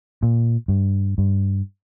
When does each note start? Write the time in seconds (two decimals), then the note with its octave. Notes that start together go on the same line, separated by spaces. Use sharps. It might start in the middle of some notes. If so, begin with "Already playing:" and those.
0.23 A#2
0.68 G2
1.18 G2